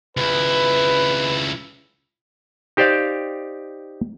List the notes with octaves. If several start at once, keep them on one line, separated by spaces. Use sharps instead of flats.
C#2 E4 B4
D#4 G4 C5 D5 F5